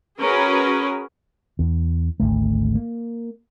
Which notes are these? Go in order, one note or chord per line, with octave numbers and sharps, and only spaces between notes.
C#4 F#4 G#4 A#4 B4
E2
G#1 D2 A3
A#3